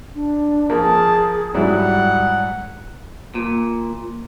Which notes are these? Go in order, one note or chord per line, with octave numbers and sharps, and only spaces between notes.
D4
F3 A#3 G#4 A5
G#2 F#3 G3 E4 F#5
A#2